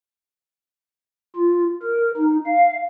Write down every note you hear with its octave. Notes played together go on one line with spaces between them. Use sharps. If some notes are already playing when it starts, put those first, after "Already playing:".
F4
A#4
D#4
F5